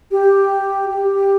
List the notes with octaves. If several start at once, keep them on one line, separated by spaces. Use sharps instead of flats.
G4
G4